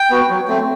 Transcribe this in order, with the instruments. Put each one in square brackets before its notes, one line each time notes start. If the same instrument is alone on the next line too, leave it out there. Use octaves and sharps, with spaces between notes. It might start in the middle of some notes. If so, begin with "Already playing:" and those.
Already playing: [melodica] G5
B3 F#4
F#3
A3 C4